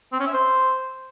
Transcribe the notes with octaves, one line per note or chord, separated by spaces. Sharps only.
C4
C#4
E5
C5